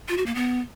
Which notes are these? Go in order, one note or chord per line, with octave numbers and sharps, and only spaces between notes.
F4
F#4
A#3
B3